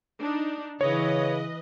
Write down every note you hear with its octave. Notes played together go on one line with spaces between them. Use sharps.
D4 D#4
C#3 E3 E4 B4 C#5 D#5